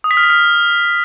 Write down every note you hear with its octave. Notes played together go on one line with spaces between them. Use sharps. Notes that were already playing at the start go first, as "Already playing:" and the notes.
D#6
B6
F6
B6
F6